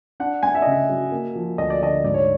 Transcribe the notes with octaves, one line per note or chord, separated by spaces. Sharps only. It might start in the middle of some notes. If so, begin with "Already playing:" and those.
D4 F#5
A3 G#5
E5
D#5
C#3
E5
F#3
A#3
F3
D2 D#5
D5
D3 D#5
G#2 D5
C#5